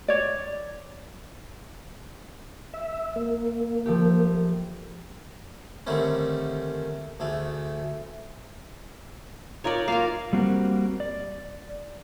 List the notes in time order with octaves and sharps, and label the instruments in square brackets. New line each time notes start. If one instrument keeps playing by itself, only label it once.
[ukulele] C#5 D5
[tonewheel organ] E5
A#3
[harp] F3 A3 G4
[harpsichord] D3 D#3 G3 A3 C4 C#4
D2 A3 G#4
[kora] D#4 F4 A#4 [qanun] C#5 D5
[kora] A#3 [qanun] F4 A#4 F5
[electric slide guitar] G3 A#3 C4 F#4
D5